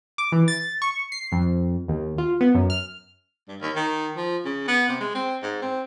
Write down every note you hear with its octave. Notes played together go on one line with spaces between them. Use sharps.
D6
E3
A6
C#6
C7
F2
D#2
F4
B3
F#2
F6
G2
D#2
D#3
F3
C#3
B3
C3
G#3
C4
G#2
C4